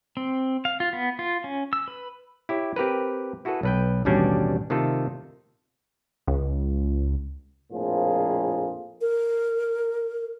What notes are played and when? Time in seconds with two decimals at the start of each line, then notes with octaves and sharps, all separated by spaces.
0.17 C4
0.65 F5
0.80 F4
0.93 B3
1.19 F4
1.44 C#4
1.73 E6
1.88 B4
2.49 E4 G4 C#5
2.76 C4 G4 A#4 B4
3.45 E4 F#4 G#4 A4 B4
3.63 B1 B4 G5
4.05 A1 D#2 B2 G3 C#4 D4
4.70 C3 D#3 A3 D#4 F4 A4
6.27 C#2
7.72 A#1 F2 A2 A#3 F4 G#4
9.01 A#4